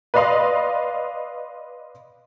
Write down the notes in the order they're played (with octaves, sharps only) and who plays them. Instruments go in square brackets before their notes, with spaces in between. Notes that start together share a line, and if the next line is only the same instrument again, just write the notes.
[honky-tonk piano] B4 D5 D#5 F5 C6 D#6